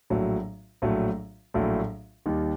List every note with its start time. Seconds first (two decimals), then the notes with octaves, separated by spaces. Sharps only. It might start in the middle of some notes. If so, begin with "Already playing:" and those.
0.10 A#1 A2 F#3 A3
0.82 A#1 A2 F#3 A3
1.54 A#1 A2 F#3 A3
2.26 D#2 D#3 G3